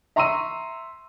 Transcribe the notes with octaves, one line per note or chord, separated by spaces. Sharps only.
E5 A#5 C6 C#6 E6 D#7